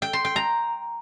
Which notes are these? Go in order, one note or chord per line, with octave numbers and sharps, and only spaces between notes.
G5
C6
G5
A#5